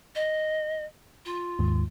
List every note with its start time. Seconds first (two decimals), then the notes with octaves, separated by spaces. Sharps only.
0.15 D#5
1.25 F4
1.59 D#2 G#2